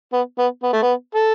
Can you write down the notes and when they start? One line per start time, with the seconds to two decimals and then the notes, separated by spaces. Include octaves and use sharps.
0.13 B3
0.39 B3
0.63 B3
0.73 A3
0.82 B3
1.15 A4